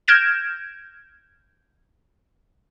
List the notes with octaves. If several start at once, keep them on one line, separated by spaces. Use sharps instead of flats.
F6 G6 G#6 A#6 D7 E7